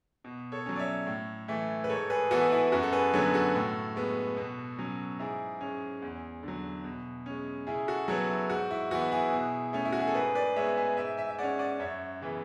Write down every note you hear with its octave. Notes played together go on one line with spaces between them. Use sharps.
B2
A4 C#5
F#3 C#4
D5
C#5 E5
A2
E3 A3
B4
G#2 A4 C#5
G#4 B4
E3 B3 F#4 A4
E4
F#2 F#4
A4
G#4 B4
D3 F#3 B3 A4 C#5
F#4 A4
A2
G#3 B3
B2
F#3 C#4
G#2 E4 G#4
G#3 C#4
E2
D3 F#3
B2
G#3 C#4
C#3 E4 G#4
F#4 A4
F#3 B3 A4 C#5
E4
G#2 F#4
E4
E3 B3 F#4
E4 G#4
B2
A3 C#4
E4
F#4
G#4
A4
G#2 G#4 B4
B4 D5
G#3 B3 C#5 E5
E5 G#5
G#2 E5 G#5
E5 G#5
E5
G#3 C#4 D5 F#5
D5 F#5
F#2 C#5 E5
C#3 E3 B3